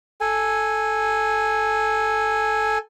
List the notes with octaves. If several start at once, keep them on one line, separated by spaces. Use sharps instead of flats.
A4 G#5